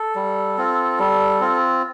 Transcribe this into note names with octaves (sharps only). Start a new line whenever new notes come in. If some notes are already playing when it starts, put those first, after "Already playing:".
Already playing: A4
G3
C4 F4
G3
C4 F4